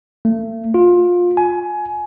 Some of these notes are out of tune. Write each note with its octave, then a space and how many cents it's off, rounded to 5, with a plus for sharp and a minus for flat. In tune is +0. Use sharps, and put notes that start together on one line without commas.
A3 +35
F4 +20
G#5 +20